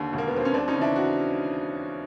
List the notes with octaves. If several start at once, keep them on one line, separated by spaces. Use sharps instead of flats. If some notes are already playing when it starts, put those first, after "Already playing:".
Already playing: D#2 D3
E1
A#3
B3
D#2 D3 C4
C#4
D#2 C4 D4
C#4 D#4
C#3
E3 D4 E4
F#4